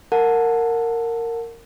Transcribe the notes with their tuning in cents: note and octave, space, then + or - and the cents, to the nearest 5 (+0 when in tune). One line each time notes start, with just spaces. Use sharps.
A#4 -15 F#5 -20 A5 +0